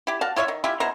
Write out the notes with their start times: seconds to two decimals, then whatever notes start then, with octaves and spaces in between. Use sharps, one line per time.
0.07 E4 G4
0.21 F#4 F5 A5
0.36 E4 F4 C#5 E5
0.48 D#3
0.64 E4 F4 G4 E5
0.80 B2 E4 C5 A#5